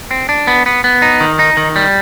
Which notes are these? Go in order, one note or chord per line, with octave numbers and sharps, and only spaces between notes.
C4
D4
B3
B3
B3
D#4
D#3
D#4
D#3
G3